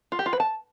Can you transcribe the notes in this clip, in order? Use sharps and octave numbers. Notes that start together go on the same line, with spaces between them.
F4
G4
F4
B4
A5